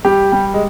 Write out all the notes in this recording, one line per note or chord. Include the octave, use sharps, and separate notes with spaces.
G3 G4
G3
G#3